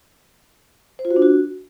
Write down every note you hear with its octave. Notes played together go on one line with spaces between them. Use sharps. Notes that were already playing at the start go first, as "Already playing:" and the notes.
C5
F4
F#4
D4
F#4